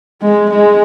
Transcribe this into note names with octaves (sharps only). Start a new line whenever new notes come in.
G#3
G#3